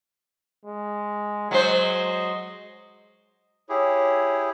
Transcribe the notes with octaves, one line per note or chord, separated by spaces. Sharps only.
G#3
F#3 G#3 C5 D#5
E4 G4 G#4 C#5